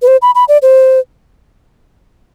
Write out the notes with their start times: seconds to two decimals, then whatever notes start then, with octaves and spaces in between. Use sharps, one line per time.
0.02 B4
0.07 C5
0.22 B5
0.35 B5
0.48 D5
0.62 C5